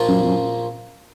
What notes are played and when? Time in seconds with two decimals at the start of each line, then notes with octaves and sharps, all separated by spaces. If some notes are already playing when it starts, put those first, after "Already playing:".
Already playing: A#1 A#2 F3 A#3 F4
0.08 F#2
0.23 F2
0.27 F#2